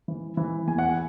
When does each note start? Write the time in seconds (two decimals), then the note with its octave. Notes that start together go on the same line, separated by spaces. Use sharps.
0.08 E3
0.37 E3
0.67 E2 G#5
0.78 F#5
0.89 G#5